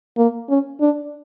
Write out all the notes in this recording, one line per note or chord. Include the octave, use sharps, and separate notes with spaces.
A#3
C#4
D4